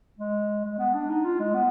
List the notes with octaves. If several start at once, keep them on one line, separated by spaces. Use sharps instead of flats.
G#3
G#3
B3
D4
D#4
F4
G#3
B3